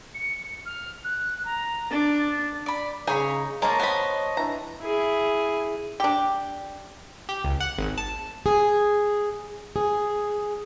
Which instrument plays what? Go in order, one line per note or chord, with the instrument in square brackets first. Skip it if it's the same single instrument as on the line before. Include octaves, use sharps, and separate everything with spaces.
[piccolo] C#7
F6
F#6
A#5
[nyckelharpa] D4 [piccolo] A6
[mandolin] D5 B5
[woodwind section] C#3 [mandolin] D#4 C#5 [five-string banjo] G#4 B5
[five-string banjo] G#3 A#3 [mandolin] A#4 A5 [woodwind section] C#5 D#5
[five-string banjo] B3 B5 [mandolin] C5 A5
[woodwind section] E3 D4 [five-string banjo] A#5
[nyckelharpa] E4 G#4
[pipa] D4 G4
[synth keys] G4
C#2
F#5
G#1
A5
[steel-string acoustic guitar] G#4
G#4